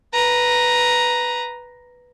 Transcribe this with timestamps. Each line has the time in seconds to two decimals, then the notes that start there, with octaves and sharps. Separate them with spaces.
0.14 B4 A#5